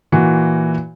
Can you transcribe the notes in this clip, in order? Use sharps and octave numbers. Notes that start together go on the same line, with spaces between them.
A#2 E3 F#4